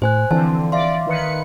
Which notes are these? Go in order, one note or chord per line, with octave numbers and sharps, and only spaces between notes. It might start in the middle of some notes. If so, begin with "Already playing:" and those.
A2 C5 G#5 F#6
D3 E3 F3 C4 A5
D5 E5 F5 C6
D#3 B4 C#7